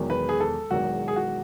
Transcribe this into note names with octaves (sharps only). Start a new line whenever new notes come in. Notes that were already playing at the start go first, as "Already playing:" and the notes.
Already playing: E1 E2 D#3 F#3
B4
G#4
A4
E1 E2 D#3 F#3 F#4
G#4
F#4